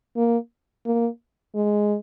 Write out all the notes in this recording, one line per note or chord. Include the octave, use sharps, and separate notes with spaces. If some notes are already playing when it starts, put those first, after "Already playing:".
A#3
A#3
G#3